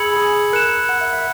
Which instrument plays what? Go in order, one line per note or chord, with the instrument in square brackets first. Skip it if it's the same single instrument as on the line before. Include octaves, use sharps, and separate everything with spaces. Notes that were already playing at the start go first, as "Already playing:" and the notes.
Already playing: [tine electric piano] G#4 [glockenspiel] B5 E6 G#6 C#7 F#7
[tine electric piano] G#4
[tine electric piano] A#4 [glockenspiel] F#6 C#7 E7
[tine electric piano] F#5
E5
E5